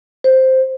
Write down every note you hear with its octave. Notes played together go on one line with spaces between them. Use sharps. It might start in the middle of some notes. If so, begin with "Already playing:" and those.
C5